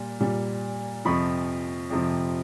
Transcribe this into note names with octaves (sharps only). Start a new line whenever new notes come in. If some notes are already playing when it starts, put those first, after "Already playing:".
Already playing: A#2 G3
A#2 G3
F2 C3 F3 B5 C#6
F2 C3 F3